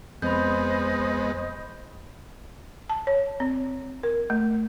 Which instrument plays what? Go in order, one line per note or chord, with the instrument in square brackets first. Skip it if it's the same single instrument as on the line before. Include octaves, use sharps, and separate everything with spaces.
[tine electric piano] F2 [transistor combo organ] G#3 B3 [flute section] C5 D#5 D#6 [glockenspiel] B5 G6
[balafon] A5
C#5
C4
A#4
A3